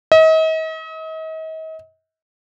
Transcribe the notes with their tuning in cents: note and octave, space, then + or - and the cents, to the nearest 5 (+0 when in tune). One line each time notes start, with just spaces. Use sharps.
D#5 +40